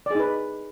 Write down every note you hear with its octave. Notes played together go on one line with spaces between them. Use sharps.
D#4 G#4 B4 D5